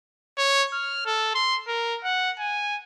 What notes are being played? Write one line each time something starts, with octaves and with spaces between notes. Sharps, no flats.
C#5
F6
A4
C6
A#4
F#5
G#5